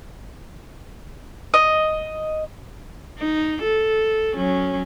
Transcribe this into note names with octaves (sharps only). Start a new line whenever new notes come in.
D#5
D#4
A4
F#3 C#4